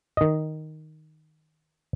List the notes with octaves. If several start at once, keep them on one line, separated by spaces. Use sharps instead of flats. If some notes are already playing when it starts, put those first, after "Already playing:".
D#3 D#5